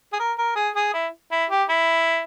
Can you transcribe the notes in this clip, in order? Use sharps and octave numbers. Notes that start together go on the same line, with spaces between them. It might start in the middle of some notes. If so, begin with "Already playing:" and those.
G#4
A#4
A#4
G#4
G#4
E4
E4
G4
E4